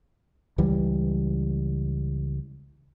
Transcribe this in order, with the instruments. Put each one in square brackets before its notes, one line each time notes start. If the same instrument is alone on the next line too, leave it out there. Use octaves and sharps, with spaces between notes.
[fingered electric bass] C#2 E3 G3